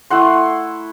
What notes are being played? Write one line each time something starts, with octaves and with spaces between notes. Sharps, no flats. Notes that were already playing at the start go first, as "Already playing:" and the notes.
A3 E4 F#5 C6